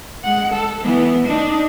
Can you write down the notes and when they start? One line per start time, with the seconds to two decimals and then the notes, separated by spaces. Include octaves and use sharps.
0.24 G#3 F#5
0.53 A4
0.84 E3 B3
1.27 D4 D#4